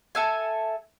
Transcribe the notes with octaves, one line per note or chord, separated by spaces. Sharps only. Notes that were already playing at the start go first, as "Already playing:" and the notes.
A4 E5 G#5